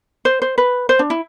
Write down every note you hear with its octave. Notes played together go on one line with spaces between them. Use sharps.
C5
C5
B4
C5
D4
E4